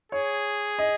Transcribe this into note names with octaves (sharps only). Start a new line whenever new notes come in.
G#4 C#5
D#5